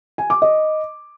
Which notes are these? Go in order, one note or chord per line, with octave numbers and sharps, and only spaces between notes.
G#5
D6
D#5